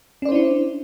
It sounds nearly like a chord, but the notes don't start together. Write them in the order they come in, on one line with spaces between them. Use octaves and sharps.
C#4 D5 C5 E4 D4